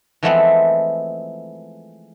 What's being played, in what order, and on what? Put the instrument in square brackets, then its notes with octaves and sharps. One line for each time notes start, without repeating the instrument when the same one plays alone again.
[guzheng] E3 F3 G#3 A3 B3 C4